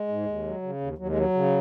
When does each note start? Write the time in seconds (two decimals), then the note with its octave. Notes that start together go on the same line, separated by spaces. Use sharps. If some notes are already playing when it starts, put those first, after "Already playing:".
Already playing: G#3
0.08 G#2
0.26 D#2
0.44 F#3
0.62 C#3
0.81 D#2
0.98 D#2 F#3
1.09 G#3
1.16 F#3
1.34 C#3